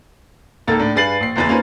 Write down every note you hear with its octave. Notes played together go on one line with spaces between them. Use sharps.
C#2 A#3 D#4 A4 A6
A2 D4
G2 G#4 B4 A6 C7 F#7
A#1 C7
F#1 E2 E3 B4 A6
A#3 C#4 D#4 F4 B4 C5